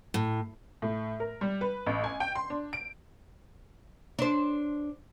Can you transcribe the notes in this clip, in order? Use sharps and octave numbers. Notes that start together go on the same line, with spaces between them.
A2
A2
A#4
G3
B4
A1
G#5
G5
C6
D4
D7
D4 C5